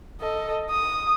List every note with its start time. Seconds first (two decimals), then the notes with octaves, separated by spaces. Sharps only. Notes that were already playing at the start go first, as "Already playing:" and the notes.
0.21 A4 D#5
0.70 D#6